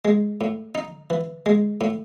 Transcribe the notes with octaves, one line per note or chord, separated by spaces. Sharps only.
G#3
A2
D#4
E3
G#3
A2